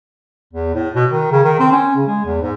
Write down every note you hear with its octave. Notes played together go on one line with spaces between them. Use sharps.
E2
A2
B2
D#3
C#3
D#3
C4
C#4
C#3
G#3
E2
G#2